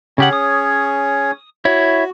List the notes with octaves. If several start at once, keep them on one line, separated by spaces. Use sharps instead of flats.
C#3 C#4 G4 G#4 C#5 F#5
D#6
E4 F#4 C#5